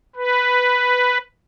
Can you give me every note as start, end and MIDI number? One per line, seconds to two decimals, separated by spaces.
0.16 1.18 71